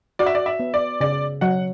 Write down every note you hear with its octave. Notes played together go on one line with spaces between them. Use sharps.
F#4 D5
E5
D5
E5
B3
D5
C#3 D5
F#3 F#5